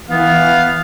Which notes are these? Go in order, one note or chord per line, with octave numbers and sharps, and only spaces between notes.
E3 B3 F5